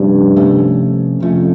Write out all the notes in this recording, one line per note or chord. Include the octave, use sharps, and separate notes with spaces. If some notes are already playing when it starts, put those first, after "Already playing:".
Already playing: G2 C3 F3 A3 C#4
C3 F3 A3 C#4
F2 C3 F3 A3 C#4